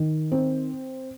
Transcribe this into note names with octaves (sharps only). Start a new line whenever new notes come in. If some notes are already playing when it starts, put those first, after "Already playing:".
Already playing: D#3
C4